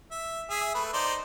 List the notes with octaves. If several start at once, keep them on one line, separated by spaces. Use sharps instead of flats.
E5
G#4 E5
A3 B4
D#4 C5 D5